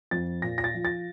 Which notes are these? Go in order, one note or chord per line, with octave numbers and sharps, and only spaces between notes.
F2 A6
A#2 A#6
A#6
A6
F3
A6